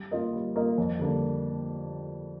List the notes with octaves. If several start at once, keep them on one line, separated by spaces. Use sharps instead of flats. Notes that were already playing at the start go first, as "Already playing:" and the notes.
Already playing: G3
A#3 F4 A#4 D#5
G3
A#3 F4 A#4 D#5
F2
D3 G3 A#3 D4